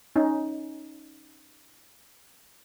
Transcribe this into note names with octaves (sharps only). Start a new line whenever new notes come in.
C#4 D#4